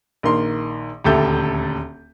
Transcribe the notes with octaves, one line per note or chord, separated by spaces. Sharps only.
A#1 D#3 A#3 A#4 C6
D#1 D2 G4 A4 E5 G6